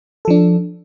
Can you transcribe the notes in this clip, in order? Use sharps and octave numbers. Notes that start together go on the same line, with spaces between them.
F3 D4 A4